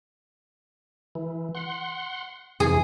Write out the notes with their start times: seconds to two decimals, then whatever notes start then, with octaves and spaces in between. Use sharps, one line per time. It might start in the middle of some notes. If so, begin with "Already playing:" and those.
1.15 E3
1.55 F#5 C6
2.60 F2 C3 E3 G#4